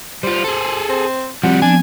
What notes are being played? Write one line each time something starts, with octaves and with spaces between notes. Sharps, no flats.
G3 F4 C5
G#4 A4
C4
F3 G3 C4 F#5
F3 B3 D4 G#5